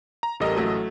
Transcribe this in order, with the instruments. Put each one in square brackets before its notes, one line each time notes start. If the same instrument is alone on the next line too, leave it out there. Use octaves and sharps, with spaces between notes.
[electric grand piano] A#5
[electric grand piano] A1 A4 D#5 [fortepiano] G3 A#4
[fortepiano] F#3 A3